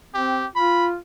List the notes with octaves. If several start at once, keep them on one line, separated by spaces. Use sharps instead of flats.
C4 G4
F4 B5